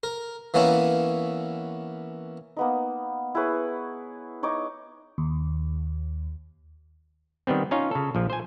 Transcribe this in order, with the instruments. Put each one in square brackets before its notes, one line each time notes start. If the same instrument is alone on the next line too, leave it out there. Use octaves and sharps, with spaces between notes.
[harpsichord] A#4
E3 A#3 B3 C#4 E4
[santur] A#3 B3 D#4
E4 G#4 B4 C#5
D#4 C#5 D#5 D6
[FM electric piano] D#2
[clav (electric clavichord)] D#3 G3 B3 C4
C#4 D#4 F4 C#5 F5
C#3 A4
A#1 F3
C5 G#5